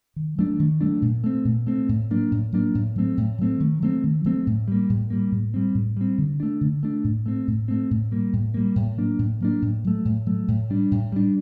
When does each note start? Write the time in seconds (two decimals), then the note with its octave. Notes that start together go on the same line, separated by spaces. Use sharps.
0.16 D#3
0.38 F#3 A3 D4
0.59 D#3
0.81 F#3 A3 D4
1.02 A#2
1.24 A3 C4
1.45 A#2
1.67 A3 C4
1.89 A2
2.10 F#3 A#3 D4
2.31 A2
2.52 F#3 A#3 D4
2.75 A2
2.96 F#3 A3 C4
3.17 A2
3.38 F#3 A3 C4
3.60 D#3
3.82 F#3 A3 C4
4.04 D#3
4.24 F#3 A3 C4
4.47 A2
4.68 G3 A#3
4.90 A2
5.10 G3 A#3
5.32 A2
5.54 G3 C4
5.75 A2
5.97 G3 C4
6.18 D3
6.40 A3 D4
6.61 D3
6.83 A3 D4
7.04 A2
7.26 A3 C4
7.48 A2
7.68 A3 C4
7.91 A2
8.11 G3 A#3
8.33 A2
8.54 G3 A#3
8.76 A2
8.98 F#3 A#3 D4
9.19 A2
9.40 F#3 A#3 D4
9.62 A2
9.84 F#3 A3
10.05 A2
10.26 F#3 A3
10.48 A2
10.70 G3 D4
10.91 A2
11.12 G3 D4